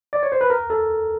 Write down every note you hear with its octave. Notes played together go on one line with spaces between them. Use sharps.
D5
C#5
C5
B4
A#4
A4